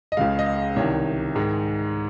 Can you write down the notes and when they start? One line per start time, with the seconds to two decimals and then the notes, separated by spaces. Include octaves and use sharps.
0.12 D#5
0.17 C#2 C#3 G#3 F5
0.39 D#5
0.46 F5
0.76 C2 C3 D#3 C#5
1.35 G#2 D#3 G#3